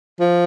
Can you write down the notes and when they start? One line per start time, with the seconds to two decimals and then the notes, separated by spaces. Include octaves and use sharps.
0.20 F3